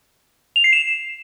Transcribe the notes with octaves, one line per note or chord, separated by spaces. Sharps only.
F7
C7
E7